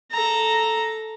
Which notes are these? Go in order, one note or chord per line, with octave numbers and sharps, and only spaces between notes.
A4 A#5